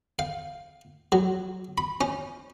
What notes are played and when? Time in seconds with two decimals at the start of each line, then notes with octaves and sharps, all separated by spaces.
0.19 F5
1.12 F#3
1.78 B5
2.01 C#4